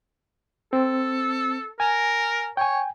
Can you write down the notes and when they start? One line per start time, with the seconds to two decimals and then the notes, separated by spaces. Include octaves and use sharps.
0.73 C4 A4
1.80 A#4 G#5
2.57 C#5 G5 G#5